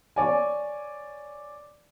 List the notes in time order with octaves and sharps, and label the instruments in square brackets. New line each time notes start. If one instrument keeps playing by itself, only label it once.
[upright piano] C#5 D5 G#5